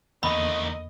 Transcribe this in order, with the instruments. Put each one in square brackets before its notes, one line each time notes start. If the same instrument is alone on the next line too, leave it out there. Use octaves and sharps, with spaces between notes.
[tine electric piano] E2 D3 A#3 [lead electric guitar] D#3 A3 [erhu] D#5 [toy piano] B5